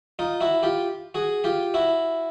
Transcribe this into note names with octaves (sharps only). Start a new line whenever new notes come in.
D#4 F4
E4 F#4
F4 G4
F#4 G#4
F4 G4
E4 F#4